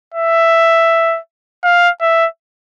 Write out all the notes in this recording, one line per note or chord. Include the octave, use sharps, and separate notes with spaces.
E5
F5
E5